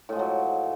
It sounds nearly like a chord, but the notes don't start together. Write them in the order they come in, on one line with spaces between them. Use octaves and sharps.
A2 G#3 F3 F#3